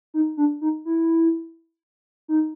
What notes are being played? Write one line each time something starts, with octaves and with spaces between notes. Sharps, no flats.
D#4
D4
D#4
E4
D#4